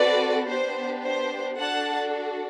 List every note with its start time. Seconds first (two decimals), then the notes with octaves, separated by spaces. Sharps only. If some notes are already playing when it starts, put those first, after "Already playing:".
Already playing: C4 F#4 A4 B4 D5
0.48 B3 D4 G4 C5
1.03 C5
1.58 D4 F#4 A4 F#5 A5